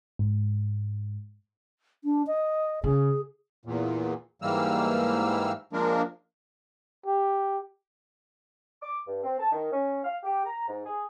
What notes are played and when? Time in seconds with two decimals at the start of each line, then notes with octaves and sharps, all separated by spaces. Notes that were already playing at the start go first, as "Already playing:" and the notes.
0.19 G#2
2.04 D4
2.27 D#5
2.84 C#3 G#4
3.65 E2 A#2
4.42 G#2 E3 G3 A#3 E6 F6
5.73 F3 G#3 A#3 D4 A#4
7.06 G4
8.81 D6
9.07 G2
9.23 C4
9.38 A5
9.52 D#3
9.71 C#4
10.04 F5
10.23 G4
10.45 A#5
10.67 G#2
10.85 G#4